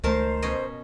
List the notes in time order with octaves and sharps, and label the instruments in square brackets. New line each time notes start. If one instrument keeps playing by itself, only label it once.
[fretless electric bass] C#2 A3 [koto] D#3 A#4 A5 [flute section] C5
[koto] B2 C#4 D#5